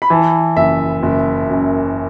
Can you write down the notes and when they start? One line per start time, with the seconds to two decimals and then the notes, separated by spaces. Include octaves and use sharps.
0.02 B5
0.10 E3 A5
0.56 F#1 E5
1.03 F#1
1.49 F#2